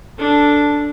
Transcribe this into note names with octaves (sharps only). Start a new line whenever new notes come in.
D4 A4